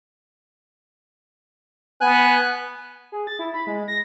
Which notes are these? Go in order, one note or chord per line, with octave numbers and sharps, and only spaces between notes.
B3 G#5 F#6
G#4
A6
E4
B5
G#3
A#6